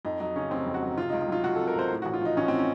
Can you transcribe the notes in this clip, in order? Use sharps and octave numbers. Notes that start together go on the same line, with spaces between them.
F2 D#4
F#3 D#4
C#3 C#4
F1 C4
F2
F#4
F#3
C3 F4
D#4
C#2
D#4
F#3 F4
C#2 F#4
C3 A4
A#4
C#2 C5
A2
A1 F#4
F4
F3 D#4
A1 C#4
A2 C4
C#4